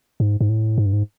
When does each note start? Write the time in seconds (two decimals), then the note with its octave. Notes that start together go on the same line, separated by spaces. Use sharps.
0.20 G#2
0.41 G#2
0.49 A2
0.78 G#2
0.86 G2
0.93 G#2